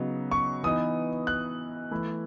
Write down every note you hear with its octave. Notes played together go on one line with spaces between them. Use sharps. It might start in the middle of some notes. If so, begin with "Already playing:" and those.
Already playing: C#3 F#3 B3 D#4
C#6
E3 B3 D#4 D#6
F#6
E3 A3 E4